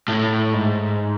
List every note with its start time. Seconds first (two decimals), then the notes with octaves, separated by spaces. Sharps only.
0.08 A2
0.53 G#2